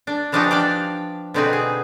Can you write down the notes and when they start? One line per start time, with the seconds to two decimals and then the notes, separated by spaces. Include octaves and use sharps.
0.07 D4
0.32 E3 F3 D4 D#4 F#4 G4
0.51 D4 D5 F5 G5
1.34 B2 D3 C4 D#4 G#4 B4
1.53 G#4